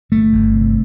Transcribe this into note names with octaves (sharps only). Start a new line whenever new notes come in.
G1 A3
G1
C3